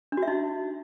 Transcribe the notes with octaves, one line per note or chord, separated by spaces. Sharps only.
D4
F#4
E5
D#4